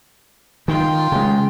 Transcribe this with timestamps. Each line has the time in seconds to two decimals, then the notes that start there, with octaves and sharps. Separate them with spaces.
0.68 D#3 F4 G5
1.12 C#3 G#3